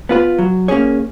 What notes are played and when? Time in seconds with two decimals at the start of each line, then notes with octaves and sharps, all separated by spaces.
0.09 B3 F4 B4
0.39 F#3
0.68 A#3 C#4 G#4 C#5